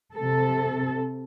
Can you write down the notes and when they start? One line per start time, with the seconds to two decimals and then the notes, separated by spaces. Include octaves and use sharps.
0.16 C3 A4